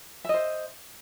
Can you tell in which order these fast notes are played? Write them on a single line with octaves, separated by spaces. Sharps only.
E5 D#5 C5